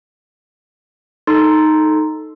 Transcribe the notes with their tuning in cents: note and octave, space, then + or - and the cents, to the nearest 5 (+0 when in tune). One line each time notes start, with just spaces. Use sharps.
D#4 +0 A4 +0 C6 -5